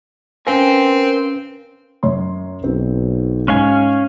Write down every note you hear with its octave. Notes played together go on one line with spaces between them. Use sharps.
C4 C#4 A#4 B4 F5 G#5
F#2 C#5 C6
B1 C4
G#2 C#4 F5 G#5